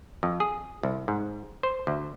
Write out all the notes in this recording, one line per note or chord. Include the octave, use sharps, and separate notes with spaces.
F2
G#4
C2
G#2
C5
D2